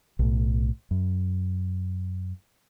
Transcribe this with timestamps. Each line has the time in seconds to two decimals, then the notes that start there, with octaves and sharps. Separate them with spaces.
0.19 B1 A2
0.91 F#2